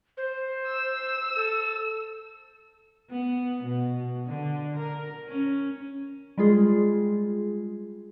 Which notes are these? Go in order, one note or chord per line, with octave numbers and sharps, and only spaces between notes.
C5
E6
A4
B3
B2
D3
A#4
C#4
G3 G#3 F4 G#4